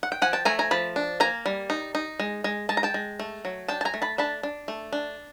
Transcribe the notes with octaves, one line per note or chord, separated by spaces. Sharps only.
F#5
G5
F3 F#5 G#5
G5 A5
A3 G#5 A#5
G#5 A#5
F3 A5 B5
D4
A#3 G#5 A#5
G3
D#4
D#4
G#3
G#3
G#3 A5
A#5
G5 A5
G#3
A3
F#3
D4 G5 A5
A5
G#5 A#5
A3
A5 B5
D4 A5 B5
D4
A3
D4